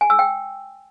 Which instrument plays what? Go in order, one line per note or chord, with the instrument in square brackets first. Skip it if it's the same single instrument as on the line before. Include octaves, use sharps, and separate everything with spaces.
[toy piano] G#5
E6
G5